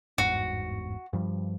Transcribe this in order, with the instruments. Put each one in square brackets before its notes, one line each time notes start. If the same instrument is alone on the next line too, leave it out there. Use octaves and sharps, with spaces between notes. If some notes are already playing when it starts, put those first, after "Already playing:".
[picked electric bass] G1 E2 G#2 [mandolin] F#4
[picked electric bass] G2 F3 G3